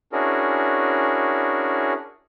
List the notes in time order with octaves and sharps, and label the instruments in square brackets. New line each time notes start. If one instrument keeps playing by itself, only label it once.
[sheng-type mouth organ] C#4 D4 E4 F#4 G#4 A#4